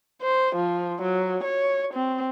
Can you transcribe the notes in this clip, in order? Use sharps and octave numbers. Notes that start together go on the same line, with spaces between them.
C5
F3
F#3
C#5
C4